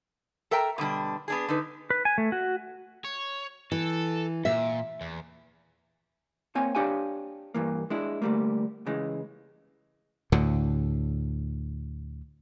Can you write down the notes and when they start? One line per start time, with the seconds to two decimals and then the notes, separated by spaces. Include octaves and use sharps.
0.51 A4 A#4 E5 G5 A#5
0.78 B2 D3 G3 D4
1.28 B3 D4 G#4
1.48 D3 D#4 B4
1.90 B4
2.05 G#5
2.18 A3
2.32 F#4
3.04 C#5
3.72 E3 A4
4.45 A#2 E5
5.01 E2
6.55 A#3 C4 C#5 G#5
6.75 D4 G4 C#5 F5 G#5
7.55 G2 E3 A#3
7.90 G#3 D4 E4
8.22 D2 A2 G3 A3 A#3
8.86 C#3 E3 G#3
10.32 D2 A2 D3